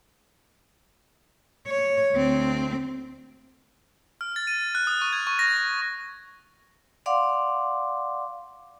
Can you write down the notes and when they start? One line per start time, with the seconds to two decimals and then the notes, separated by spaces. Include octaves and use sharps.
1.67 C#5
2.13 D2 C4
4.21 F6
4.36 A6
4.47 D#7
4.75 F#6
4.87 D#6
5.02 C#6
5.13 G#6
5.27 C#6
5.39 A#6
5.57 A#6
7.06 D5 F5 F#5 C6 D6